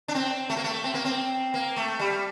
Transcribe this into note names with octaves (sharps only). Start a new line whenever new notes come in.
D4
C4
A3
A#3
A3
C4
A#3
C4
A#3
A3
G3